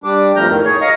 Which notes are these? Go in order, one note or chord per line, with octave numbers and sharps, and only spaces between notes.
G3 D4 D6
B2 F3 A3 A#5 F6 G6
F2 A2 D#3
G#4 C#5
D#5 F5 A#5 C#6